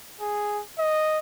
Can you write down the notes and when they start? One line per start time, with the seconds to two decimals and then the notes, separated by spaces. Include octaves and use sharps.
0.21 G#4
0.79 D#5